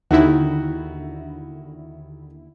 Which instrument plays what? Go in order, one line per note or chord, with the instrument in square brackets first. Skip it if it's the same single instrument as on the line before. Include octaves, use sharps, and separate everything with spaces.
[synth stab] D#2 D3 E4 [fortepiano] D#3 F#4